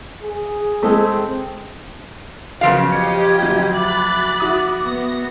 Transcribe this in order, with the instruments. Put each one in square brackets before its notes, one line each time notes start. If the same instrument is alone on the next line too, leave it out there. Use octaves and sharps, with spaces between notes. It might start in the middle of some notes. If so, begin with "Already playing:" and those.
[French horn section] G#4
[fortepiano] G#3 A3 [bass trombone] C4
[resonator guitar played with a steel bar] C#3 F3 F5 [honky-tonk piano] F#3 B3 [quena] A#4 [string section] C#5
[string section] F4 G4 D#5 [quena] G#6 [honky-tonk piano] C#7
[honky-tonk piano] D2 F#3 G6
[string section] B5 F#6 A6 [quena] D6
[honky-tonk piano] F#4 E5 D#6
[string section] B3 A#6